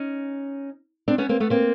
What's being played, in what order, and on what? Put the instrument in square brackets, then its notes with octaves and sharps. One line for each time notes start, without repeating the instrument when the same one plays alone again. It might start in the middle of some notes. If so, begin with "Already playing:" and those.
Already playing: [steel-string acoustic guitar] C#4 D#4
C4 D4
B3 C#4
A#3 C4
A3 B3
A#3 C4